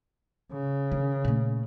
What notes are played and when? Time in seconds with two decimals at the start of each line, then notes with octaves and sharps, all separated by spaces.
0.52 C#3
0.92 D#3
1.25 A#2 A3